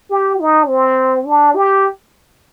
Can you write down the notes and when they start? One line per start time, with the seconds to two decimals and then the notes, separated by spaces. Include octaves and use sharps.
0.10 G4
0.40 D#4
0.68 C4
1.26 D4
1.56 G4